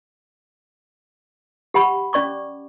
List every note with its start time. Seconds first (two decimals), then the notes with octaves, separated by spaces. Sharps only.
1.74 G4 F#5 B5 C#6
2.13 C#4 D5 C#6 D6